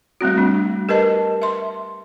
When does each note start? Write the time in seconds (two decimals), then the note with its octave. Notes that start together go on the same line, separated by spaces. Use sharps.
0.21 G3 A3 C4 F#4
0.38 D4
0.89 G4 A#4 B4 D#5 A5
1.42 E5 C6